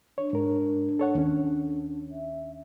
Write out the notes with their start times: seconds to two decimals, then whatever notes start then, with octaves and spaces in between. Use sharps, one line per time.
0.18 D4 C#5
0.33 G#2 A#4
0.99 A4 C#5 F#5
1.15 D#2 C#4
2.11 E5